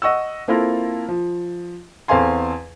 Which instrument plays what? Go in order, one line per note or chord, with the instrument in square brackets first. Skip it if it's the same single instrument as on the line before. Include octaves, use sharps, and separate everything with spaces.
[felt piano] D#5 F#5 C#6 E6
A#3 C4 E4 F4 A4 A#4
F3
E2 C4 A4 F5 G#5 C6